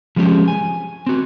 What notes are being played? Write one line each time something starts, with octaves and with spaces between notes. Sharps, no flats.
F3 G#3 C4 C#4 G4
G#5
C4 F#4